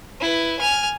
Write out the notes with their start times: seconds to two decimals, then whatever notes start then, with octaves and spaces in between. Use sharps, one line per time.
0.20 E4 B4
0.59 G#5 F6